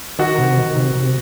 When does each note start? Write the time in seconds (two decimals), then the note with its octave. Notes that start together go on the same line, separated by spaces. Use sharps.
0.19 D#3 F#4
0.39 C3
0.57 D#3
0.76 C3
0.95 C3